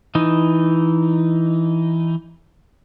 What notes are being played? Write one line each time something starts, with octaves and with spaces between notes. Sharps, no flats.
E3 D#4